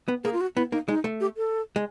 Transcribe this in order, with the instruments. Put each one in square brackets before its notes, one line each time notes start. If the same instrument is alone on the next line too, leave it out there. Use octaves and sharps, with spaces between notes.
[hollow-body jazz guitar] B3
[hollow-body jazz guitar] A#3 [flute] G#4
[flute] F4
F#4
[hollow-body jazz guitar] B3 [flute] E4
[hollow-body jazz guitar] A#3 [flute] D#4
[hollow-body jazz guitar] G#3 [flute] D#4
[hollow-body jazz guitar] A3
[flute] G4
A4
[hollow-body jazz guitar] G#3